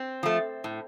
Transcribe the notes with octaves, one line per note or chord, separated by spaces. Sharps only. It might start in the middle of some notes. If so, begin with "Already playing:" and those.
Already playing: C4
F3 A3
A2